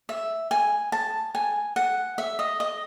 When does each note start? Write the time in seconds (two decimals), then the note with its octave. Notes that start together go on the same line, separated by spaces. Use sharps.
0.09 E5
0.51 G#5
0.92 A5
1.35 G#5
1.76 F#5
2.18 E5
2.39 D#5
2.60 D#5